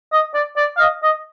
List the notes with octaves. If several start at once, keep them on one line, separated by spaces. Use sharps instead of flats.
D#5
D5
D5
F5
D#5
D#5